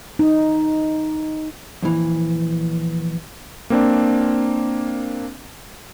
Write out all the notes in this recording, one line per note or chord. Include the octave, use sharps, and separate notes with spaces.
D#4
F2 A#2 E3
A#3 C4 D4